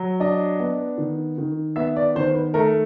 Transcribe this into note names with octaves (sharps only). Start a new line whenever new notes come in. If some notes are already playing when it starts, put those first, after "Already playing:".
Already playing: F#3
D4 D#5
B3
D#3
D#3
B3 E5
D5
D#3 C5
B4
A3 A#4